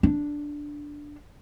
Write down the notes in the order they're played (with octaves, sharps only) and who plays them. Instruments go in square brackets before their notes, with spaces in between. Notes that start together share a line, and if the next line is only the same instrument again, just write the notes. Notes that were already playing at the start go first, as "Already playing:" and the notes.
[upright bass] D4